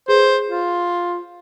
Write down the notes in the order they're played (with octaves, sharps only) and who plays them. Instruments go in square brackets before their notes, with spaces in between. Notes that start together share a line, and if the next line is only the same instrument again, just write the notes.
[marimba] G#4 B4 [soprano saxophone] C5
[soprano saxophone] F4